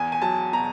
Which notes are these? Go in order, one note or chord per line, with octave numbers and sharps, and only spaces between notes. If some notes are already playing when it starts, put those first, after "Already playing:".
Already playing: E2 G#5
G#5
F#3 A5
B2 A#5